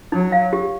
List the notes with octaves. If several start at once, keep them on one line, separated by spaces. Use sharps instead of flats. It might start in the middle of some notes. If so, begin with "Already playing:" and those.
F#3 D#4
F5
G4